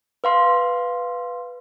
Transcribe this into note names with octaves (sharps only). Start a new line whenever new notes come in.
B4 F5 C6